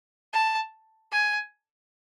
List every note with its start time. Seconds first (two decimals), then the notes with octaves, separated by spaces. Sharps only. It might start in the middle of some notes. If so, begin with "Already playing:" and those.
0.33 A5
1.12 G#5